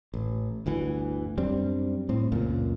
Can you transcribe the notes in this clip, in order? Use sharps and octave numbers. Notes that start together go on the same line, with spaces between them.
A1
G1 D2 E3
F#2 G3 C4 D4
A2 C4
C#2 F#2 A#2